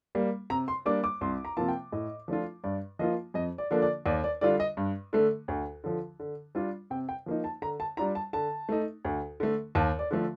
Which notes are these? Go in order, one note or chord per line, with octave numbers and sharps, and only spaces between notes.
G3 A#3
C3 A#5
C6
G3 A#3 D4 D6
D6
C2 C6
A#5
C3 F3 A#3 F4 A5
G5
A2 D#5
F3 A3 D4 F4
G2 D5
F3 A#3 F4 D#5
F2 D#5
D5
D3 F3 A#3 D4
D5
D#2 D5
D5
D3 G3 D4 F4 D5
D#5
G2
D3 A3
D2
D3 F3
D3
G3 D4 F4
C3 G5
G5
F3 A#3 D#4
A5
D3 A#5
A5
G3 D4 F4 A#5
A5
D3 A5
A3 D#4
D2
D3 A3
D#2 A5
D5
D3 F3 A3